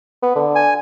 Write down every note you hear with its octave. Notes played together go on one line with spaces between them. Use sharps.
B3
D3
G#5